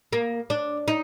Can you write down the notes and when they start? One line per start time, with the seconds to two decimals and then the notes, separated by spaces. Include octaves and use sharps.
0.13 A#3
0.50 D4
0.88 D#4